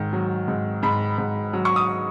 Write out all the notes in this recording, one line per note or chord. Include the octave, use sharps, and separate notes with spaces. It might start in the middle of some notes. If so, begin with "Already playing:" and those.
Already playing: G#2 D#3
F#3
G#2
G#2 B5
G#2
F#3
C#6
D#6